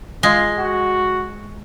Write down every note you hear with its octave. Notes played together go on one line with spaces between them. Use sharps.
G#3 F4
F#4